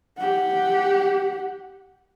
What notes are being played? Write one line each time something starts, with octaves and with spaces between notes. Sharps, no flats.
G4 F#5